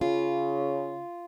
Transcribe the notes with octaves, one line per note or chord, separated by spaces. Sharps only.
C#3 F4